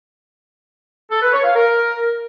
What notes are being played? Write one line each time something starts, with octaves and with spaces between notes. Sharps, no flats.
A4
B4
C#5
F5
A#4